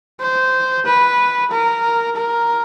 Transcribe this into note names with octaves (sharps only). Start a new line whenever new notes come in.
C5
B4
A#4
A#4